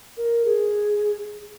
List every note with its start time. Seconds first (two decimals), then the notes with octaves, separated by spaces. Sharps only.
0.17 A#4
0.45 G#4